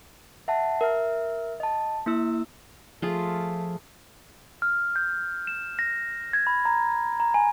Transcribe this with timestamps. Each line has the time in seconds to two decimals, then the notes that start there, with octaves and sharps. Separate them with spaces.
0.48 E5 F#5 A5
0.81 A#4 E5 F6
1.60 D#5 A5
2.06 A#3 E4 E6
3.02 F3 A3 F4 G#4
4.62 F6
4.96 G6
5.47 E7
5.79 A#6
6.33 G#6
6.47 B5
6.65 A#5
7.20 A#5
7.34 G#5